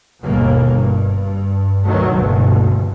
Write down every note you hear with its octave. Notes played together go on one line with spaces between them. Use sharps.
G1 D#2 B2 A#3
G2
D2 B2 D#3 F#3 A3
F#1 D2 G2 B2 D3